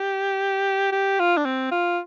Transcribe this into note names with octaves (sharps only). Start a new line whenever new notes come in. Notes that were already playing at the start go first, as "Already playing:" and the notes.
Already playing: G4
G4
F4
D4
C4
F4